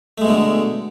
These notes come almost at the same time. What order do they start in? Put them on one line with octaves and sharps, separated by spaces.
A3 G#3 B2 D3